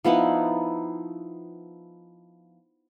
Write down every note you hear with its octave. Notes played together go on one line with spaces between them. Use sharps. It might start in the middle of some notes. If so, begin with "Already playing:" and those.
F3 B3 D#4 E4